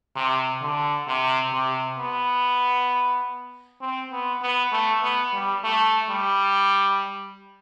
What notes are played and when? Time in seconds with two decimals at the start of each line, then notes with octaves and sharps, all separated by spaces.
0.16 C3
0.62 D3
1.07 C3
1.53 C3
1.99 B3
3.81 C4
4.12 B3
4.42 B3
4.72 A3
5.02 B3
5.33 G3
5.64 A3
6.09 G3